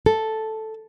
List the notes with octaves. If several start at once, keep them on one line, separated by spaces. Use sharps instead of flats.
A4